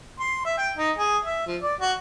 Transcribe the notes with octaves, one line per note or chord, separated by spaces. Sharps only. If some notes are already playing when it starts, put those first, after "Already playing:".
C6
E5
G5
D#4
G#4
E5
F3
D5
F#4